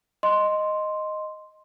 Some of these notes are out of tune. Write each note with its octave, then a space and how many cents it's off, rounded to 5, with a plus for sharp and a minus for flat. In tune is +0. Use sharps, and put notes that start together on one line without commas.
D#5 +0 C6 +0